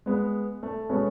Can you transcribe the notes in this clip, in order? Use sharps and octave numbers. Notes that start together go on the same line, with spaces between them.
G#3 B3
A3
F#3 G#3 A3 B3 C#4